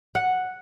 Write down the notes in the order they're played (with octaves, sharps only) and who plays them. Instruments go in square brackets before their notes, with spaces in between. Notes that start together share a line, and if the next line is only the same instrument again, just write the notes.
[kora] F#5